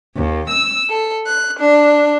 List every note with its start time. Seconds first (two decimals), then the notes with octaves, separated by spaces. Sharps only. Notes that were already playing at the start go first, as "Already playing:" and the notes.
0.16 D#2
0.50 E6
0.88 A4
1.25 F#6
1.59 D4